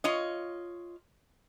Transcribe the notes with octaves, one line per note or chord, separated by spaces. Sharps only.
F4 C#5 D#5